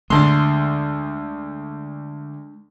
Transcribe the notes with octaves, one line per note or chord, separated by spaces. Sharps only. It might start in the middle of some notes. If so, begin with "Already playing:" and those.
D2 G#3 A3 D4 C6